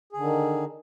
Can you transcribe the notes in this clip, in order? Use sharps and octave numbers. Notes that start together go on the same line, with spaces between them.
D3 D#3 G#4